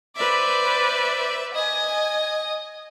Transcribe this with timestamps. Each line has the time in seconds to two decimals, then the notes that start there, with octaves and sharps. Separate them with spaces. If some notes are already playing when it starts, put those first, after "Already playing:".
0.16 B4 C5 D5 E5
1.55 D#5 G#5